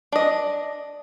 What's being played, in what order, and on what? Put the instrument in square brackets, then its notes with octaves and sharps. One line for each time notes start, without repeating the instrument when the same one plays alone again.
[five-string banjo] D4 D#5